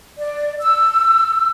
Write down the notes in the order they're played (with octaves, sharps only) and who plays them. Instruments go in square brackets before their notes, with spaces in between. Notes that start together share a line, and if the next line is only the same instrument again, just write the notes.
[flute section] D5
E6